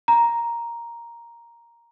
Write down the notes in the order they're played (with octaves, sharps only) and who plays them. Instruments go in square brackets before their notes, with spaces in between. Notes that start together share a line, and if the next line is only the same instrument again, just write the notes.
[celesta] A#5